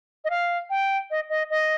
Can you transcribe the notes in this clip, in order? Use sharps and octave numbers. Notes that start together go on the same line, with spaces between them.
D#5
F5
G5
D#5
D#5
D#5